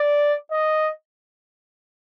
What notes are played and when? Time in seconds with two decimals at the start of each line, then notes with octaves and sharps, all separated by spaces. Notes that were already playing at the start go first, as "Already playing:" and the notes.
Already playing: D5
0.51 D#5